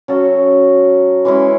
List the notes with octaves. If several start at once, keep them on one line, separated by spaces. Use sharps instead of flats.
F#3 C#4 F#4 A4
E3 G#3 C#4 E4